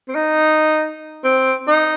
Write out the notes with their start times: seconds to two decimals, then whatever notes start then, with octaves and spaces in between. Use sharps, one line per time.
0.08 C4
0.15 D#4
1.24 C4
1.68 D#4